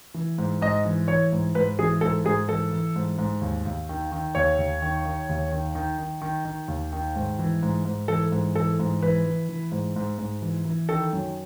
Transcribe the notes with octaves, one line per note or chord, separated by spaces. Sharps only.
E3
G#2
G#2 D#5
E3
E3 C#5
G#2
G#2 B4
E3 G#4
G#2 A4
G#2 G#4
E3 A4
E3
G#2
G#2
D#2
D#2
D#3
D#3
D#2 C#5
D#2
D#3
D#3
D#2
D#3
D#3
D#3
D#3
D#3
D#2
D#3
G#2
E3
G#2
G#2
E3 A4
G#2
E3 A4
G#2
E3 B4
E3
E3
G#2
G#2
G#2
E3
E3
D#3 A4
F#2